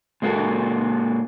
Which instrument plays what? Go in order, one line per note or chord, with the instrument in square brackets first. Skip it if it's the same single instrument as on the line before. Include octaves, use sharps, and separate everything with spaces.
[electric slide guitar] A#2 G#3 A#3 B3 F#4 A4